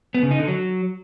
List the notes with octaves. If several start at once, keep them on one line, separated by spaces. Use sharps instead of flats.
B3
C#3
D#4
D3
F#3